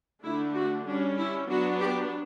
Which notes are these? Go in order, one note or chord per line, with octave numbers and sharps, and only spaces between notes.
D3 A3 D4 E4
F#4
G3 C#4 D4
E4
F#3 B3 D4 F#4
G4